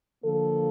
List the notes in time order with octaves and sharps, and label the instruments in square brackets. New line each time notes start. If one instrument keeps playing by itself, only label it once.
[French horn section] D3 F3 A#3 A4